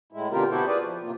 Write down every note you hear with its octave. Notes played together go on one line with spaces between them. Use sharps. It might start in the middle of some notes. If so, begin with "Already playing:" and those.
A2 G#3 E4
B2 D3 C4 F4 G4 A#4
B3 E4 F#4 G4 A4 C5
F4 G#4 B4 D5
F3
A2 C3 A#3 F4